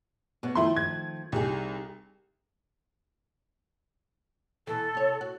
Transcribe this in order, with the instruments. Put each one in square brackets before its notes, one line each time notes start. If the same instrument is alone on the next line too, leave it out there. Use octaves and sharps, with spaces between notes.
[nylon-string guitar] B2 B3 C#5
[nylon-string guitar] D#3 F3 A3 [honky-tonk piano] E4 C6
[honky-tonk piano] G#6
[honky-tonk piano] C2 [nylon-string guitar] D#4 G4 G#4
[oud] B2 E3 [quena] A4
[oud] C3 C#5
F#4